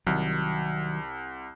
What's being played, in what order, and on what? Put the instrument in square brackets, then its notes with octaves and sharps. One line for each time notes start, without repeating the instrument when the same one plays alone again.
[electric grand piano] C2 [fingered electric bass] D#3 F#3